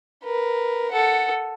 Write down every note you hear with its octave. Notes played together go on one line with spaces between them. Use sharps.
A#4 B4
A4 F#5